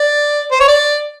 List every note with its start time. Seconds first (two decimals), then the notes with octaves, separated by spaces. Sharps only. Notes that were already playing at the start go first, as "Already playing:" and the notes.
Already playing: D5
0.52 C5
0.60 C#5
0.68 D5